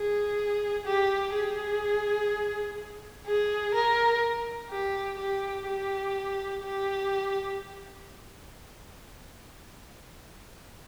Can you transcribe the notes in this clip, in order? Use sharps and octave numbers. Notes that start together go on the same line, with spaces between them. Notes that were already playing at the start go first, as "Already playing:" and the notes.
Already playing: G#4
G4
G#4
G#4
A#4
G4
G4
G4
G4